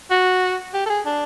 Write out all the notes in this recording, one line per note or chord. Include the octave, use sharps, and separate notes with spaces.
F#4
G4
A4
G#4
D4